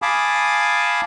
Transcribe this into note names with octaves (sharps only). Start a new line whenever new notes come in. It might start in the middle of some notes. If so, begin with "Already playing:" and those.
F5 G#5 A5 B5 D6 D#6